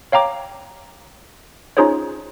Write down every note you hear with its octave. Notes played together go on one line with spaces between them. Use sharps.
C#5 F5 G5 A#5 D6
C#4 D#4 F4 G#4 C5 C#5